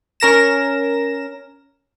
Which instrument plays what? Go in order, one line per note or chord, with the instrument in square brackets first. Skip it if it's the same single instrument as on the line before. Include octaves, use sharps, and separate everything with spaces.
[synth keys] C#4 A#4 A#6 E7